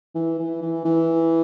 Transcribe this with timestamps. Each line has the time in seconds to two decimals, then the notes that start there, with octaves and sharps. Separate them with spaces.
0.15 E3
0.39 E3
0.62 E3
0.85 E3